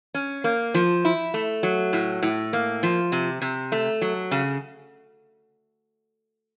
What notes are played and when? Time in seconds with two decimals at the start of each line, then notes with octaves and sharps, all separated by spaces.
0.14 C#4
0.44 A#3
0.74 F3
1.05 E4
1.34 A3
1.63 F#3
1.93 A2
2.22 A2
2.53 A#3
2.83 F3
3.12 C3
3.42 C3
3.72 A3
4.01 F#3
4.31 C#3